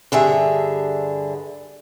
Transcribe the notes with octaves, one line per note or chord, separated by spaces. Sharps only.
G2 D3 G#4 E5